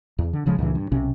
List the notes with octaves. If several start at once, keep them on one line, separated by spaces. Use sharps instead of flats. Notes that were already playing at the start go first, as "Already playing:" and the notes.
E2
D3
D1 C#3 F3 G#3
C#2 G2 A#2 E3
G2
B1 C3 C#4